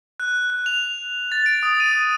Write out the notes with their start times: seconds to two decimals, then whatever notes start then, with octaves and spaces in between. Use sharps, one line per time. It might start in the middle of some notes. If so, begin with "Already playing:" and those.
0.20 F#6
0.50 F#6
0.66 F7
1.32 A6
1.46 D7
1.63 D#6
1.80 D#7